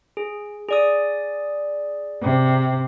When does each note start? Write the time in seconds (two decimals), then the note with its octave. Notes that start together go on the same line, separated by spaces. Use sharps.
0.17 G#4
0.69 G#4 D5 D#6
2.22 C3